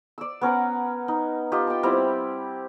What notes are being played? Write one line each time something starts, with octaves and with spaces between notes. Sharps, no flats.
D5 E6
B3 C#4 A#4 F#5
D#4
F4 G4 D#5
G5 A5
G3 C4 E4